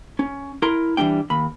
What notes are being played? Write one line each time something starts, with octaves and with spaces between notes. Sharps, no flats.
C#4
E4 A#4 A#5 C6
E3 F3 G3 D4 G5
D#2 B5